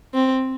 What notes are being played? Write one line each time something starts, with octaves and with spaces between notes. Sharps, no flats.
C4